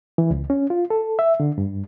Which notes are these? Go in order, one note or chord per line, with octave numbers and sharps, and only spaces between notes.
E3
C#2
C#4
F4
A4
E5
D3
G2